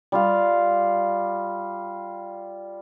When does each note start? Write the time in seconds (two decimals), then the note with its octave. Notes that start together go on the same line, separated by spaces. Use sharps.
0.12 G3 F4 F5